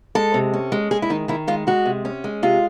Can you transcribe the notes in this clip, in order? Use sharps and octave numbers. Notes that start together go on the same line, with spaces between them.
G#3 A4
C3
C#4
G#3
G#3 G#4
E4
D#3 D#4
D#3 E4
G#3 F4
G#3 F#4
C3
C#4
G#3
C3 F4